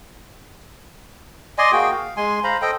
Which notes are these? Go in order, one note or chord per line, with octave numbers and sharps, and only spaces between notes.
D5 D#5 G#5 C6
A#3 F#4 G#4 G5
F5
G#3 G#5 C6
C5 F5 A#5 B5
A4 C5 D#5 G5